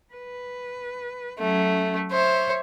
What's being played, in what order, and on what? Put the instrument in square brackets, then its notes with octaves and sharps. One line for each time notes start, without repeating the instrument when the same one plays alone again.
[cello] B4
[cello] F#3 C#4 [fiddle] A3
[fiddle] C5 [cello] C#5 E5